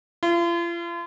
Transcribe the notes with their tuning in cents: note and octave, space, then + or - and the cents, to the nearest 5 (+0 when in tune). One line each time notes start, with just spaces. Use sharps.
F4 -40